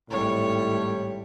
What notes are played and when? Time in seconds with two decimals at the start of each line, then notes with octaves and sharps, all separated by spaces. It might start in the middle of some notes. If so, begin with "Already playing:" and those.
0.10 G#1 A2 G3 C#5